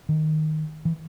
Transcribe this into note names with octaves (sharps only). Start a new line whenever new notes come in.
D#3
E3